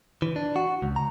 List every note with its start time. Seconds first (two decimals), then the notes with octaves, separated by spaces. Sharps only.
0.22 E3
0.36 D4
0.56 F#4
0.82 C#2
0.96 A#5